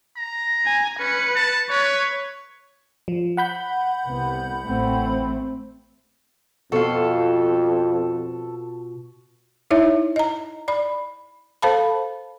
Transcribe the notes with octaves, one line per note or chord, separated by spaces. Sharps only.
A#5
G#5
C#4 B4 C#7
A5
B4 C#5
F3
F#5 B5 G6
C2 C3 B3
A1 A3 C4
F2 B2 F4 A4 F5
D#4 E4 C#5 E5
D#5 A#5
D5 B5
A4 C5 F5 A5 B5